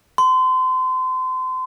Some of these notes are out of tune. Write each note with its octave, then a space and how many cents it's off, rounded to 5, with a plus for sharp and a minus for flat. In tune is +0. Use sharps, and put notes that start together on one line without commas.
C6 -30